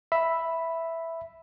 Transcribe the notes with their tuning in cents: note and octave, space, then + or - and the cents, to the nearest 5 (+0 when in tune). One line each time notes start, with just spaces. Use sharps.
E5 +0 B5 +0